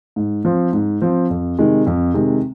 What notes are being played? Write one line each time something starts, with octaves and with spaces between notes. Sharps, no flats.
G#2
F3 C4
G#2
F3 C4
F2
C3 D#3 G#3
F2
C3 D#3 G#3